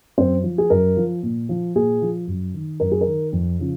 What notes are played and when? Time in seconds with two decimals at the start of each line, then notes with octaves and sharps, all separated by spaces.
0.18 F#2 C4 C5
0.44 F3
0.58 G#4
0.70 F#2 A#4
0.97 F3
1.23 A#2
1.49 F3
1.75 A#2 G#4
2.02 F3
2.27 F#2
2.54 D#3
2.80 F#2 A#4
2.92 G#4
3.01 A#4
3.07 D#3
3.33 F2
3.59 C#3 F3